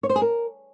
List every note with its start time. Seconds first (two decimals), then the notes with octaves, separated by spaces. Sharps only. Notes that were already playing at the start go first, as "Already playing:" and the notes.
0.03 C#5
0.09 C5
0.16 G#4
0.22 A#4